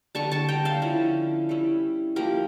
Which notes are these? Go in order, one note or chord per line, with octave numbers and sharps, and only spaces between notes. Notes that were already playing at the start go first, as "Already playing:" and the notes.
D3 G3 D4 A5 C#6
A5 C#6
G5 A#5
F5 A5
D3 F3 C#4 E4
G3 C#4 E4
F3 A#3 E4 G4 A#4